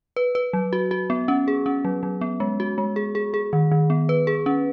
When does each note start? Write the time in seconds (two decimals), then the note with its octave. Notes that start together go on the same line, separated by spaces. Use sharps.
0.16 B4
0.35 B4
0.53 F#3
0.73 F#4
0.91 F#4
1.10 B3
1.28 C#4
1.48 G#4
1.66 C#4
1.85 F#3
2.03 F#3
2.21 B3
2.40 G#3
2.60 F#4
2.78 G#3
2.96 G#4
3.15 G#4
3.34 G#4
3.53 D#3
3.72 D#3
3.90 B3
4.09 B4
4.27 G#4
4.46 C#4